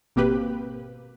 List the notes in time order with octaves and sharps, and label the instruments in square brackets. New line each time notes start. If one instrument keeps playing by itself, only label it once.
[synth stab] G#1 B2 A#3 C4 G4 B4